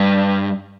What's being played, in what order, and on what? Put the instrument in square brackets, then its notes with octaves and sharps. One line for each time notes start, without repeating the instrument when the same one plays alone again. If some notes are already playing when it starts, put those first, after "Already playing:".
Already playing: [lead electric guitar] G2